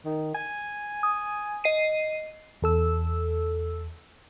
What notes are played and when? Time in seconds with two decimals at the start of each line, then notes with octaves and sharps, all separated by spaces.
0.05 D#3
0.35 G#5
1.03 D#6
1.64 D#5 C7 D#7
2.62 E2 A4 E6